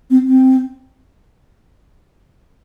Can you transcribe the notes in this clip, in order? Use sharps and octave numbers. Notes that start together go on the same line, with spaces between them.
C4
C4